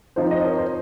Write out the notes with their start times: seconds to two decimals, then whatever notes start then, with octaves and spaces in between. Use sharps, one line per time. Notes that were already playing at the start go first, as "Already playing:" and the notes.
0.16 F3 C4 D#4 C5 D#5
0.30 C5 D#5
0.44 A#4 C#5
0.58 C5